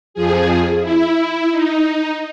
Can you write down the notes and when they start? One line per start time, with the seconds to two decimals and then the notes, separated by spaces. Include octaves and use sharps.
0.14 F2 F3 G#4
0.81 E4
1.51 D#4